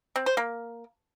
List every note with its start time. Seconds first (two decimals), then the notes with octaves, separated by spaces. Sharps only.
0.16 C4
0.26 C5
0.37 A#3